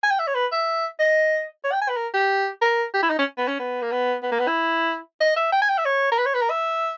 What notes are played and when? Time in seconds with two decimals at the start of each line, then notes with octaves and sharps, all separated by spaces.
0.04 G#5
0.11 G5
0.19 E5
0.28 C#5
0.35 B4
0.52 E5
1.00 D#5
1.64 C#5
1.72 G5
1.82 G#5
1.89 B4
1.97 A#4
2.14 G4
2.61 A#4
2.94 G4
3.03 E4
3.10 D#4
3.19 C#4
3.38 B3
3.48 C#4
3.60 B3
3.82 A#3
3.92 B3
4.23 B3
4.32 A#3
4.39 B3
4.47 E4
5.21 D#5
5.36 E5
5.53 G5
5.62 G#5
5.69 G5
5.78 E5
5.85 C#5
6.12 A#4
6.18 B4
6.26 C#5
6.34 B4
6.42 A#4
6.50 E5